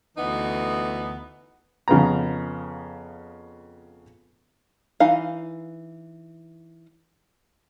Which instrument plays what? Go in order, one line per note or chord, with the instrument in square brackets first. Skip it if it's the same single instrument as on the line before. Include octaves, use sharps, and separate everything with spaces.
[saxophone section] D2 E3 B3 D#4
[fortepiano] F2 C#3 B3 A#5
[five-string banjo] E3 D#4 F5